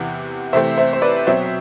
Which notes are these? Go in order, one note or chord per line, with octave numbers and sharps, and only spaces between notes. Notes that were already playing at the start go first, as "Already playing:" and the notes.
Already playing: E2 C3 E3 B3 F#5
C3 E3 A3 C4 C5 E5
C5 E5
C5
B4 D5
B2 F#3 C4 C5 E5